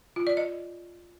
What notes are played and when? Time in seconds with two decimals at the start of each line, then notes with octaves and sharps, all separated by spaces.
0.16 F4
0.27 D5
0.37 D#5